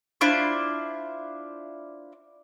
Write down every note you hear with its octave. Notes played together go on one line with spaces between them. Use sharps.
D4 E4 F4 C5